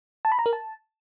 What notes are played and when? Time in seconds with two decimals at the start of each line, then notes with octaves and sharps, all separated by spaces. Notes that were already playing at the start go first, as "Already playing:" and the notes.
0.25 A5
0.32 B5
0.39 A#5
0.46 A#4
0.53 A5